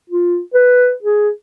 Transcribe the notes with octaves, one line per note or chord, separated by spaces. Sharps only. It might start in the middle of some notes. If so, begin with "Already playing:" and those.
F4
B4
G#4